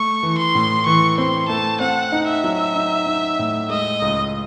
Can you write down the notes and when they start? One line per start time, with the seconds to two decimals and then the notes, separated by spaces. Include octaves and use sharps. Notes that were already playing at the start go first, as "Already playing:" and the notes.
Already playing: A3 C#6
0.23 E3
0.38 C6
0.55 A2
0.86 E3 C#6
1.17 C4 C6
1.49 A3 A5
1.80 C4 F#5
2.12 D#4
2.28 E5
2.44 F#3
2.76 D#4
3.06 D#4
3.39 A2
3.70 G#3 D#5
4.02 C#2